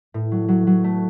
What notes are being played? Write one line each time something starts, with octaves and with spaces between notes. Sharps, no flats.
A2
F#3
F#3
F#3
A3